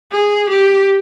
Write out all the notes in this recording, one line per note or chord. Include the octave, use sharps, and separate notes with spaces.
G#4
G4